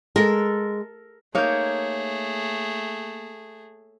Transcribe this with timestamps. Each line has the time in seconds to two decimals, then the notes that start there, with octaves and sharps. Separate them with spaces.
0.16 G#3 A4 A#4
1.35 A3 A#3 D#4 G#4 C#5 G6